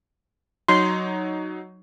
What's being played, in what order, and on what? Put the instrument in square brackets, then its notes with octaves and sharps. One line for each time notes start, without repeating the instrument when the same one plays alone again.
[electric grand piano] F#3 D#4 C#5 [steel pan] C6